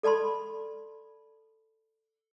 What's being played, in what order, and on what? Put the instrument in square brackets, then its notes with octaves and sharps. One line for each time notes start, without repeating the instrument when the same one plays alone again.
[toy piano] A4 D5 A5 B5 C6